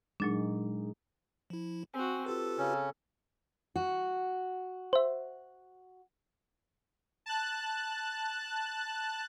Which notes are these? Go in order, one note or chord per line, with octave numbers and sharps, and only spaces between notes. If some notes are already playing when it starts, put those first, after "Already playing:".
A#2 F#3 G#3 D4 D#4
F3 E4
C4 F#4 G#5
F4 G4 A4 B4
C#3 C#4
F#4
C5 E5
A5 F#6